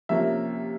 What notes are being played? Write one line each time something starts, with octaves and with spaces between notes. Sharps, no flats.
C3 F3 A#3 C#4 E5